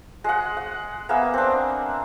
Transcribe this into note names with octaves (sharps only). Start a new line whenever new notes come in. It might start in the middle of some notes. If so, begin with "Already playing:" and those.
G#3 F#5
F#5
A#3 B3 G#4 E5
C4 D4